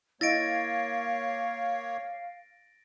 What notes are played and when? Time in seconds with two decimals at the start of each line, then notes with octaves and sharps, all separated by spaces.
0.21 A#3 E4 C#5 D#5 F5 A6 A#6 D7